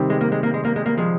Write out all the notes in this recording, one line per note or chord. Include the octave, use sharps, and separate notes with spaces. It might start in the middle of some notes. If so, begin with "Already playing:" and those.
Already playing: C3 D#3 G3 C4 G4
G#3
A#3
G#3
A#3
G#3
A#3
G#3
A#3
F3 G#3